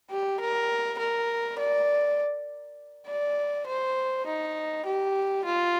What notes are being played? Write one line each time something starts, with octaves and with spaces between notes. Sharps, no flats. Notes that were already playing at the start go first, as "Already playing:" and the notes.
G4
A#4
A#4
D5
D5
C5
D#4
G4
F4